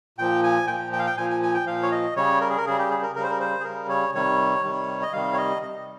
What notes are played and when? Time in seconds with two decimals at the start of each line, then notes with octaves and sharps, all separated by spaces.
0.18 A#2 F3 G5
0.43 G#5
0.67 A#2 F3 G5
0.93 G5
0.99 F5
1.07 G5
1.17 A#2 F3 G#5
1.30 G#5
1.42 G#5
1.54 G5
1.66 A#2 F3 F5
1.83 C#5
1.92 D#5
2.16 C#3 G3 C#5
2.41 A#4
2.50 G#4
2.58 A#4
2.66 C#3 G3 G#4
2.78 G4
2.90 G#4
3.03 A#4
3.15 C#3 G3 A#4
3.23 C5
3.30 A#4
3.40 C5
3.60 G#4
3.65 C#3 G3 A#4
3.89 C#5
4.15 C3 D#3 G3 C#5
4.64 C3 D#3 G3
5.02 D#5
5.13 C3 D#3 G3 F5
5.33 C#5
5.38 D#5
5.62 C3 D#3 G3 D#5